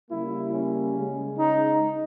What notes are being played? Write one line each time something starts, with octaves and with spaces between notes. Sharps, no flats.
C#3 G3 A#3 E4
C#4
C#3 G#3
D#4